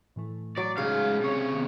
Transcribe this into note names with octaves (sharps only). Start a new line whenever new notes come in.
A2 E3 A3
F#3 D5
G#2 C#3 F5
C3 C#5
D#3 G3 B3